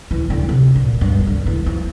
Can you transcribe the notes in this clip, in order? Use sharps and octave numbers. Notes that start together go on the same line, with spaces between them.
E3
D3
C3
A#2
G2
D3
E3
F3